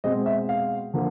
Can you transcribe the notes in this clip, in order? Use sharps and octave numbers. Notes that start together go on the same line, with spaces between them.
B2 G#3 C4 D#5
E5
F5
D3 F3 A#3